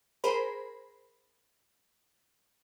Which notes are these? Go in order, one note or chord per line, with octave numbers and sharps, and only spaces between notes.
G#4 A#4 C5 B5